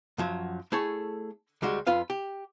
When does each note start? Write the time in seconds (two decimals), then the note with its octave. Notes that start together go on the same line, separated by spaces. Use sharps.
0.18 F#2 F3 F#3
0.72 A3 E4 G#4 A4 C#5
1.62 D2 G3 G#3 F#4
1.87 F2 F4 B4 F5
2.10 G4